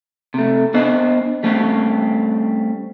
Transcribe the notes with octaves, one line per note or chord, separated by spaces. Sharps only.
C3 A3
B3 D4 C5 D#5
G3 A3 C4 C#4 G4